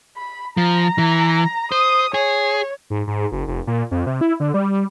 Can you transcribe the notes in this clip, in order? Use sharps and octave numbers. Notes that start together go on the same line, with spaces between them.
B5
F3 A#5
E3
C5 D#6
G#4 C#5
G#2
G#2
F#1
F1
A#2
F2
C3
E4
D3
G3